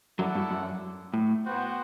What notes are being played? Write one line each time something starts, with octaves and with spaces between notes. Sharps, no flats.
F#2 F#3 E4 A4 D5 F#5
G2
F#2
A2
B3 F#4 C5 G5